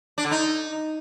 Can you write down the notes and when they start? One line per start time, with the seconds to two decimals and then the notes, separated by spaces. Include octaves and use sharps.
0.18 D4
0.24 D3
0.31 D#4